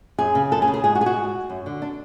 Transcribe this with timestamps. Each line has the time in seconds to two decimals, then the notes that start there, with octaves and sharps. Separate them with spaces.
0.18 F#2 G#4
0.35 C#3
0.51 F#2 A4
0.62 G#4
0.68 C#3
0.74 G#4
0.84 G#2 G#4
0.95 F#4
1.01 G#4
1.06 F#4
1.16 G#2
1.50 F#2
1.66 D3
1.82 D4